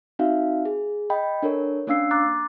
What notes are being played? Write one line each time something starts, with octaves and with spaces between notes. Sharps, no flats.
C4 D#4 F#4 E5 F5
G#4
D#5 G5 B5
D4 A4 A#4 C#5
A#3 C#4 D4 F5 E6 C7
A#5 D6 F#6 A6